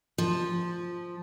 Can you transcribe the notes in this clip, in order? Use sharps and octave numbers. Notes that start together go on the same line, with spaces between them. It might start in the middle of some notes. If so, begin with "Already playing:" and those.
F3